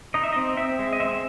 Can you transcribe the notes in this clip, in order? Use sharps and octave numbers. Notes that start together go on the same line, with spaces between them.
D#4 D#5
E5
C4 D#5
C4 E5
G#3
D#5
C4 E5